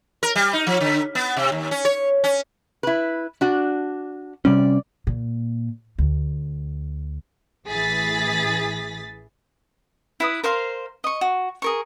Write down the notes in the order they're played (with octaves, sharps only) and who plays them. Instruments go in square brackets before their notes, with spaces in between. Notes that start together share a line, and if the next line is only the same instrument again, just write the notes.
[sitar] A#4
G3
D#4
F3
D3
B3
C3
D#2
C#4
C#5
C#4
[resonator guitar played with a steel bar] E4 B4
D4 F#4
[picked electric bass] C3 G3 C#4 [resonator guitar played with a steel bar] D5
[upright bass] A#2
D2
[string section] A1 E3 G#4 A6 B6
[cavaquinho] E4 B4 D#6
A#4 C5 F5 C6
D#5 C#6
F#4
G#4 A#4 C#6